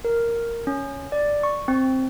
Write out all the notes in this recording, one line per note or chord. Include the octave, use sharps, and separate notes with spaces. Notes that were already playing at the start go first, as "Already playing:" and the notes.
A#4
C#4
D5
C#6
C4